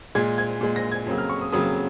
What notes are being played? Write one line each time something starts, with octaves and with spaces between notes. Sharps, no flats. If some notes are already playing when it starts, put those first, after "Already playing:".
A#2 G#3 G#6
G#6
A#2 G#3
A#6
G#6
F2 C#3 F#3 A#3
F6
C#6
D#6
F2 C#3 F#3 A#3 D#6